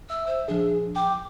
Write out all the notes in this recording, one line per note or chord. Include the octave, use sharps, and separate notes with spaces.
E5 E6
C5
A#1 F3 D4 G#4
G5 D6